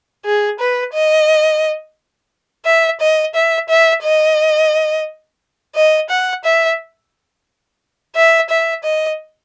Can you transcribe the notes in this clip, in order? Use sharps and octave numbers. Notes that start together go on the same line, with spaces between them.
G#4
B4
D#5
E5
D#5
E5
E5
D#5
D#5
F#5
E5
E5
E5
D#5